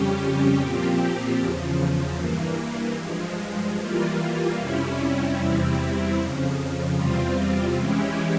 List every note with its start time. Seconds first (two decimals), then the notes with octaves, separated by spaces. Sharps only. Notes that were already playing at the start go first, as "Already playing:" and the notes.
Already playing: F2 C#3 G3 C#4 G4
0.58 A#2 F3 C4 G4
1.39 E2 C#3 F3
2.18 G2 E3 A#3
2.98 G2 F3 G#3
3.77 E3 G3 A#3 F4
4.57 F2 C3 G3 C#4 E4
5.36 E2 C3 G3 C4 E4
6.17 F2 C#3 F3
6.96 E2 C3 G3 C4 F4
7.76 E3 G#3 C#4 E4 G4